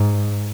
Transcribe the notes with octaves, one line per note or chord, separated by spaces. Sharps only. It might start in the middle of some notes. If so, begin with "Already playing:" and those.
Already playing: G#2